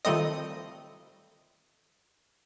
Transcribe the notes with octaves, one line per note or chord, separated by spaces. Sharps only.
D#3 F3 G3 A3 C4 D#5